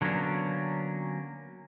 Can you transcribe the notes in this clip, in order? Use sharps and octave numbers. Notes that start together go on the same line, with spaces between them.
D3 F#3 A#3 B3 C#4 D4